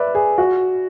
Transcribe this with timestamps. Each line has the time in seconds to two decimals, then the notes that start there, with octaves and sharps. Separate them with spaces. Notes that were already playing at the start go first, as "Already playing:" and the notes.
Already playing: B4 D5 E5
0.15 G#4
0.38 F#4